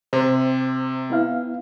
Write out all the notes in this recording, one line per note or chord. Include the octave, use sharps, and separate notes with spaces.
C3 C5
B3 E4 F5